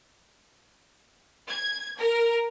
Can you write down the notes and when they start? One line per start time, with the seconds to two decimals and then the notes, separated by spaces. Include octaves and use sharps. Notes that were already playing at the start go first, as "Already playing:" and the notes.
1.49 G#6
1.98 A#4